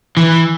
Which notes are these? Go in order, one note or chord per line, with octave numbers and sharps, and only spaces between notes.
E3